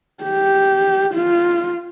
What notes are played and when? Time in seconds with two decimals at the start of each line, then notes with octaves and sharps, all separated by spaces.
0.24 G4
1.14 F4